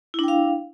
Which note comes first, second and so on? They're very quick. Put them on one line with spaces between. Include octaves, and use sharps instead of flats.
E4 D4 G5 F5